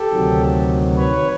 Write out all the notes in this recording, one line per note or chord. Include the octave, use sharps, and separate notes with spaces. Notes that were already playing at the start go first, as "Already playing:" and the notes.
Already playing: G4 A4
D2 C3 D#3 F#3
B4 C#5